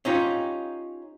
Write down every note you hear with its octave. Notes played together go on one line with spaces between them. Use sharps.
C#4 D#4 F4 G4